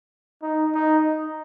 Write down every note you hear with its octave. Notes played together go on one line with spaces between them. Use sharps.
D#4
D#4